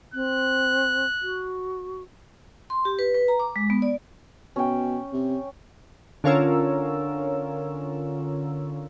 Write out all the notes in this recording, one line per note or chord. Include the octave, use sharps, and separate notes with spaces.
C4 F#6
F#4
C6
G4
B4
B4
A#5
D6
G#3
B3
D5
B2 C#4 G5
C3
D3 C#4 F4 A#4 C#5 E6